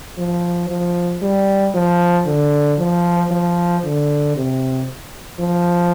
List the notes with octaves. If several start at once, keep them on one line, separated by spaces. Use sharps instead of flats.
F3
F3
G3
F3
D3
F3
F3
D3
C3
F3